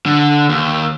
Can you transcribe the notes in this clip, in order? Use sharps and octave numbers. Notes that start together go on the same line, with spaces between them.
D3
D#2